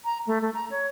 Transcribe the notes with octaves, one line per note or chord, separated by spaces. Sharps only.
A#5
A3
A3
A#5
C#5